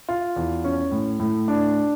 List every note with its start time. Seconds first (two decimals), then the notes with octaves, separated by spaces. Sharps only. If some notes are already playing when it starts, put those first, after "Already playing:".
0.09 F4
0.36 E2
0.64 C#4
0.91 A2
1.20 A2
1.48 D4